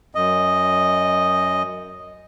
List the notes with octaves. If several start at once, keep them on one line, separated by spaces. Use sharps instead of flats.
F#2 D#5